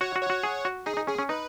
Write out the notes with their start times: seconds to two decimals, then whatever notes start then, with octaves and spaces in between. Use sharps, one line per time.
0.01 F#4 C#5 F#5
0.16 F#4
0.22 C#5 F#5
0.30 F#4
0.43 G#4
0.65 F#4
0.86 D#4 G#4
0.97 D#4
1.07 C#4 G#4
1.18 C#4
1.29 D#4 B4